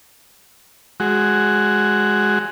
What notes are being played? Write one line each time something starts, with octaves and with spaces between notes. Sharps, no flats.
G#3 F#4